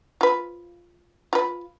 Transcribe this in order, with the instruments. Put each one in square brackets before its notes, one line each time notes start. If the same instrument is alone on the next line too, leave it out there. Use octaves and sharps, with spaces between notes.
[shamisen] F4 B4
F4 B4